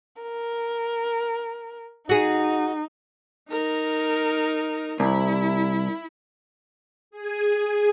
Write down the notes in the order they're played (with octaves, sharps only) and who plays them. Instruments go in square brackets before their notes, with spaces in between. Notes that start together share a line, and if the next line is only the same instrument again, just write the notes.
[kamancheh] A#4
[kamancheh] D#4 [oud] F#4 G#4
[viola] D#4 A#4
[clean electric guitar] C2 [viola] E4
[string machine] G#4 G#5